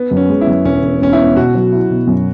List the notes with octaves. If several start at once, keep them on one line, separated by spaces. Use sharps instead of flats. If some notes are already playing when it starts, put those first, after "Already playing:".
Already playing: B3
F#2
C#4
G#3
E4
F#2
E1 C#4
E1
E1 C#4
E4
B3
B2 F#4
F#3
E4
B2
F#2